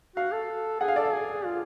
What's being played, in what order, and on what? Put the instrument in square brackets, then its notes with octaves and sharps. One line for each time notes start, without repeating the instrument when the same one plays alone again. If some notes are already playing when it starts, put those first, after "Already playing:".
[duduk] F#4 [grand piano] F5
[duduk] A4
[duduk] G#4 [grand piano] F#5
[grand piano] F5
[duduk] A4 [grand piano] D5
[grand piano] F5
[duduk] G#4
F4